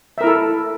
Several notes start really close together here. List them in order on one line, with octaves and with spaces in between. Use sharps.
E5 A#4 E4 A4